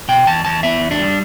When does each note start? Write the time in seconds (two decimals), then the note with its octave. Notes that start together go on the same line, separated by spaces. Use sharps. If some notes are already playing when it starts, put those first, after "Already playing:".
0.08 B2 G5
0.27 E2 A5
0.45 E2 A5
0.63 B3 E5
0.81 E2
0.91 D4
1.00 G3